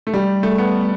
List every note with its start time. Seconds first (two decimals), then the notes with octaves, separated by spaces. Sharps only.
0.07 A3
0.14 G3
0.43 A3
0.58 B3